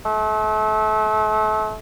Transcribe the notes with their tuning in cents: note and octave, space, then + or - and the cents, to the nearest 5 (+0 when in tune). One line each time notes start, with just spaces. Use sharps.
A3 -35